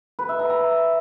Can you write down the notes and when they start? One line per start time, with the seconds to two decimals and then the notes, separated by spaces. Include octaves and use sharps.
0.19 B4
0.29 E5
0.39 A#5
0.50 A#5